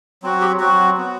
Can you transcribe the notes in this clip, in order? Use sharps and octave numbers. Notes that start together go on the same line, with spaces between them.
F#3 C4 F#4
G4
F#3 C4 F#4
B3 F#4